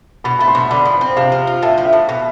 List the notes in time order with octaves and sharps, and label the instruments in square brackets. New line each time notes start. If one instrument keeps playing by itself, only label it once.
[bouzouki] B2 [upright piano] B5
[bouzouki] A3 [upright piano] B5
[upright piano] C6
[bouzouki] B2
[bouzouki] D3 [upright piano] B5
[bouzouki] F3
[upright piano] B5
[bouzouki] C4
[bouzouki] C3 [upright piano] F5
[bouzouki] F3
F4
[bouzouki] A2 [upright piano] E5
[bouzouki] F3
[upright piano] E5
[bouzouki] A2
B2